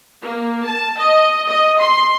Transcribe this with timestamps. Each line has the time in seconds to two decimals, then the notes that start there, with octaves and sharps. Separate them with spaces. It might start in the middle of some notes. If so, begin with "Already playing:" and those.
0.22 A#3
0.65 A5
0.97 D#5
1.49 D#5
1.79 C6